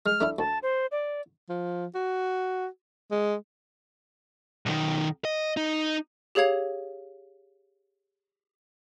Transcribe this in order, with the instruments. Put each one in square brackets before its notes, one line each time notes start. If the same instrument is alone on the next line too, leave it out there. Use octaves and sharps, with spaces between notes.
[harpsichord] G#3 [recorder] F6
[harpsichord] A3 D4 E4
[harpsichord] D2 [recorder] A5
[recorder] C5
D5
[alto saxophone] F3
F#4
G#3
[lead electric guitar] B1 D#3
D#5
D#4
[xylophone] G4 G#4 C#5 F5 G#6 F7